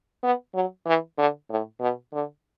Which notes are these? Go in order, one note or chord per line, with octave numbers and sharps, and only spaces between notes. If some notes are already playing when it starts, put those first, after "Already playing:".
B3
F#3
E3
D3
A2
B2
D3